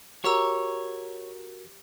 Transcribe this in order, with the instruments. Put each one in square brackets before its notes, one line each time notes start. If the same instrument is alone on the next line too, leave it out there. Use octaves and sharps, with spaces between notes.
[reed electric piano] F#4 A#4 [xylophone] G4 A#5 E6 [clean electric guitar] C#5